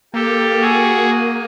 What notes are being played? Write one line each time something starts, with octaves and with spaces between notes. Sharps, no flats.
A#3 G4 A4
F#4 G#4